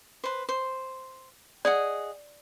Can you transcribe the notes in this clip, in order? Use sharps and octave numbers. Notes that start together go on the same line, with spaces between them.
B4 C5
C5
G#4 D5 D#5 F#5